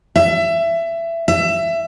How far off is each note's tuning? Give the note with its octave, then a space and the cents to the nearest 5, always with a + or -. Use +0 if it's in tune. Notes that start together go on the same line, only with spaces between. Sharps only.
E5 +20
E5 +20